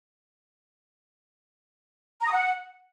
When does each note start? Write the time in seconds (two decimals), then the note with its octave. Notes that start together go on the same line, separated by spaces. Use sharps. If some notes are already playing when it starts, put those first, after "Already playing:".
2.21 A#5
2.27 D#6
2.32 F#5